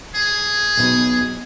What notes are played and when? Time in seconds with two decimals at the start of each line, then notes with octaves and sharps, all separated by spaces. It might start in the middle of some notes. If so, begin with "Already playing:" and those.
0.15 G#4
0.77 B1 B2